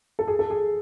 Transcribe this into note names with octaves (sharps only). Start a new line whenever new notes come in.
A4
G#4
A4
G#4